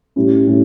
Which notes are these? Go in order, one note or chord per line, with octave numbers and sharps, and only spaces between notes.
A2 G3 C#4 E4
A2 G3 C#4